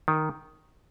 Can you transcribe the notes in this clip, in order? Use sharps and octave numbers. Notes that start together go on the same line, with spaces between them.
D#3